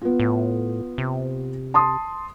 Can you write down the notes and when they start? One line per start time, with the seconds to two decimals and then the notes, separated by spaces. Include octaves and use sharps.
0.02 B3 F4
0.20 A2
0.98 C3
1.74 A5 C6 D#6